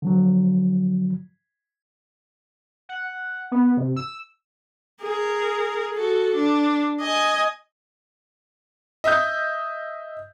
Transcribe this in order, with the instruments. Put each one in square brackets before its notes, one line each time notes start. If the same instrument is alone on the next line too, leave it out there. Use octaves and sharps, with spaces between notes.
[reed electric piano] D3 F3 F#3
[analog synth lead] F#5
B3
C3
E6
[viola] G#4 A#4
F#4 A4
D4
D#5 G#5
[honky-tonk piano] D#5 E5 D#6 G6